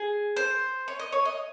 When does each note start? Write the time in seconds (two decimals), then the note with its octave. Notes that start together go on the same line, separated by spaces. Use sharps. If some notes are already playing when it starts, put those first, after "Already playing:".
Already playing: G#4
0.37 C5
0.88 C#5
0.99 D#5
1.13 C#5
1.25 D#5